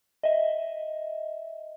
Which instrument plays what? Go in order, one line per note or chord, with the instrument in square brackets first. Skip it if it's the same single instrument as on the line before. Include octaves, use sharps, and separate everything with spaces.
[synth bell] D#5 E5